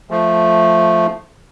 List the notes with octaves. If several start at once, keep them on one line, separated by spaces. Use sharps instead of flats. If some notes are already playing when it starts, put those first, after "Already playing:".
F3 A3